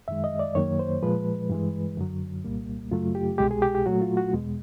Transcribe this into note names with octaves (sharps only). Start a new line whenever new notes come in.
F#2 D#3 G#3 E5
D#5
D5
F#2 D#3 F#3 A#3 C#5
C5
A#2 F3 G#3 B4
G2 E3 G#3
F#2 D3 F#3
C2 A#2 G3 A#3
F#2 C#3 F#3 A3 F4
G4
C2 B2 G#3 G4
G#4
G4
G4
A#2 F#3 A3 F#4
F4
F#4
E2 B2 G#3